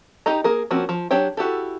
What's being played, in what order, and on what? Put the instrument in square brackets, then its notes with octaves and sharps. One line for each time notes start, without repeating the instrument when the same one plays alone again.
[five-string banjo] D#4 G4 D#5 A#5
A#3 G#4 A#4
F3 A#3 C4 C#4 F#4
F3
F#3 D4 G4 C#5 G5
E4 F#4 G4 A4